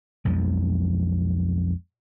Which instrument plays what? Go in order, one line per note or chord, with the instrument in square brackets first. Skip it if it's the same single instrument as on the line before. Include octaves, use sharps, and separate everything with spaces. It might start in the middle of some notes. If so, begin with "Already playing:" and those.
[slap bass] B1 F2 F3 G#3